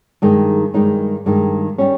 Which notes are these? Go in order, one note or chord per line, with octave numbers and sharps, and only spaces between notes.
G2 D#3 G#3 D#4
G2 D#3 G#3 D#4
G2 D#3 G#3 D#4
G3 C#4